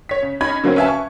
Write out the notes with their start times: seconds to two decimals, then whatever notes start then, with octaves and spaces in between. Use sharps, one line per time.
0.09 C#5 B6
0.22 C#3
0.41 C#4 D#4 B5 G#6
0.64 D3 F#3 A#3 C4 C#4
0.76 C#4 B4 E5 F5 G#5 A5
0.88 C#6